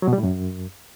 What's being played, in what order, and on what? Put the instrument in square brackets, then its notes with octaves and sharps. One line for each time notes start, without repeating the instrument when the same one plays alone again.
[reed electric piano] F#3
B2
G3
A2
F#2